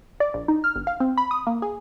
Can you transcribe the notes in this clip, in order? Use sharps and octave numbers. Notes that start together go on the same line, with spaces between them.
D5
A#1
D#4
F6
G1
F5
C4
B5
D#6
A#3
G#4